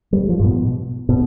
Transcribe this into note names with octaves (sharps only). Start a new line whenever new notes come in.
G3
F3
G#2
B2
B2